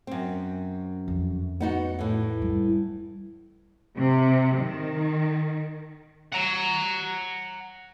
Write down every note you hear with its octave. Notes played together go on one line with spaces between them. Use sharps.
F#2 C4
F2
B3 D#4 F#4
A2 E3
G3
C3
D#3
F#5 A#5